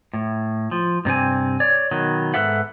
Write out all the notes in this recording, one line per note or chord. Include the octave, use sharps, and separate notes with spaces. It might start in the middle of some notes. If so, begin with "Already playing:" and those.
A2
F3
G2 C3 C4 G#5
C#5 D5
B2 D#3 F#3
G#2 A4 B4 E5 F#5